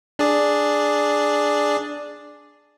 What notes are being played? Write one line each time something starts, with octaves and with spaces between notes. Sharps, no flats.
D4 G#4 D5